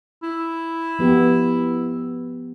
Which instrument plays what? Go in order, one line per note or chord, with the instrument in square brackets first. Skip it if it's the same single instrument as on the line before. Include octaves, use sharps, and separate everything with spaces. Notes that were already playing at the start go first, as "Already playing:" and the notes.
[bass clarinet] E4
[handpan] F3 B3 G4